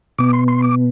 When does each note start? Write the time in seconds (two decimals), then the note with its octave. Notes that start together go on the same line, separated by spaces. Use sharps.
0.18 B2 B3 D6
0.33 C6
0.48 C6
0.62 D6